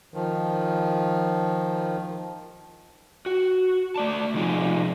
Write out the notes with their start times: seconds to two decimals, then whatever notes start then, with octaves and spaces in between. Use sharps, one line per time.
0.14 D#3 F3
3.26 F#4
3.96 A3 D5 A5
4.34 C3 F3 D#4 F4 G#4